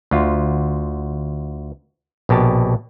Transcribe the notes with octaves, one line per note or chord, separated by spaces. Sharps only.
D2 F4
A#1 B2 G4 A5